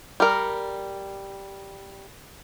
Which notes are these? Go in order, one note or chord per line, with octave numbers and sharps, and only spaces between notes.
G3 A#4